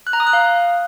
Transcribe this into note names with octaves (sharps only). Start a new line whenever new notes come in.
F#6
A#5
D#6
F#6
F5